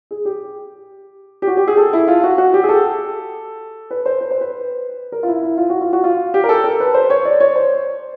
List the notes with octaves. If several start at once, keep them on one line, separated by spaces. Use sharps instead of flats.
G#4
G4
G4
F#4
G4
G#4
A4
E4
F4
F#4
F#4
G4
G#4
A4
B4
C5
B4
C5
B4
A#4
F4
E4
E4
F4
F#4
F4
F#4
F4
G4
A#4
A4
A#4
B4
C5
C#5
D5
C#5
C5